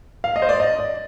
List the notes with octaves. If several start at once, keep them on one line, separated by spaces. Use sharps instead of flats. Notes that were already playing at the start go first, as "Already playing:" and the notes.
F5
D#5
C5
D5
D#5
D5